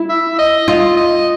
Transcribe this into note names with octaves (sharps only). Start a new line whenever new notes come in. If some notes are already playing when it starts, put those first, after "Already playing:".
Already playing: E4
E5
D#5
F4 D#5
D#5